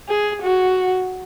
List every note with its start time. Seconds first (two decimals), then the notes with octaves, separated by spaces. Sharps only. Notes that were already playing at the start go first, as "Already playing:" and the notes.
0.08 G#4
0.43 F#4